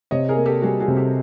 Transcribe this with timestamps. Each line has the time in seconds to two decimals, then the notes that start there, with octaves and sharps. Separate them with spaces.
0.11 C3 C#5 D#5
0.28 G#4 A#4
0.37 A#3
0.46 G4 A4
0.62 G3 F#4 G#4
0.80 F#4 G#4
0.88 C3
0.97 G4 A4